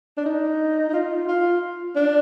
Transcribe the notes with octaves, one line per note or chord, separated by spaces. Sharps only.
D4
D#4
D#4
F4
F4
D4